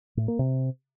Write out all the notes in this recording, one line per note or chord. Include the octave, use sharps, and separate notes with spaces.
A2
A#3
C3